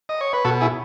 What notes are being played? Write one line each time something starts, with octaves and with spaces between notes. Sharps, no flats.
D#5
C#5
B4
B2 F#4 A4
E4 G#4